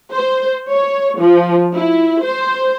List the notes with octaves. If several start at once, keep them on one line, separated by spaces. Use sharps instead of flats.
C5
C#5
F3
E4
C5